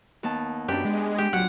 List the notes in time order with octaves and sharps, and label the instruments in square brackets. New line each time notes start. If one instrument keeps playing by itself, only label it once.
[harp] D#2 B3 A5
[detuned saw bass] F#2 [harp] D4 B4 [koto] G4
[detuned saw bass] G#3
[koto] G4
[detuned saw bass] D1 [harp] F#3 F4 [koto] F#5